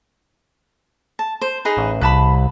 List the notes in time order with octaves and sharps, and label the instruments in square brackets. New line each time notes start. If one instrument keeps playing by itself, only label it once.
[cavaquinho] A5
C5
D#4 G#4 B4
[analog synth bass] A1
[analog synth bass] C2 [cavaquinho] B4 A5 B5